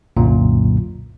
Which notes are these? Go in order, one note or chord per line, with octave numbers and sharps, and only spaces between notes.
C2 F#2 A#2 D3 F#3